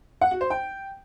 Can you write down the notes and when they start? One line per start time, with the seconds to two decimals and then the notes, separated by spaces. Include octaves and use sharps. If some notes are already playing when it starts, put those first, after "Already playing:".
0.21 F#5
0.31 F#4
0.41 C5
0.50 G5